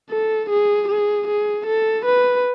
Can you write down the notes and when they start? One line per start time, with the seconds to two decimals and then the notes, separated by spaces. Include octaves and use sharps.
0.10 A4
0.49 G#4
0.88 G#4
1.27 G#4
1.66 A4
2.05 B4